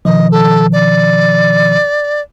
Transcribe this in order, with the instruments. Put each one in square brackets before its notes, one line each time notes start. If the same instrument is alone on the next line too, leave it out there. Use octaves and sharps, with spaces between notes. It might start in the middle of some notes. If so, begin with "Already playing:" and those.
[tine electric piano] B2 D#3 F3 [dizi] D#5
[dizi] A4
D5